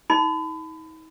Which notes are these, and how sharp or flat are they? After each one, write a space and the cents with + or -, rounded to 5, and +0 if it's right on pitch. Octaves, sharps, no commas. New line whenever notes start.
D#4 +40 B5 +30